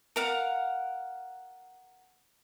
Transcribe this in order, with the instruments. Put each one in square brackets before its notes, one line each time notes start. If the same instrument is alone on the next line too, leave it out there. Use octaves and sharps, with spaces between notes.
[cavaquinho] A#4 F5 F#5